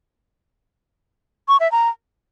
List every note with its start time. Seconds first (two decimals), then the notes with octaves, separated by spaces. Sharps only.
1.48 C#6
1.60 E5
1.72 A#5